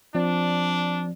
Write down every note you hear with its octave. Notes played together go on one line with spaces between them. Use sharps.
F3 C4 D4 D5